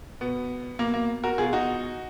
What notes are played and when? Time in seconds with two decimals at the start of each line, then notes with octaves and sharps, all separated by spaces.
0.21 B2 B3
0.79 B2 A#3
0.94 A#3
1.24 F#4 A#4
1.38 B2 F4 G#4
1.53 D#4 F#4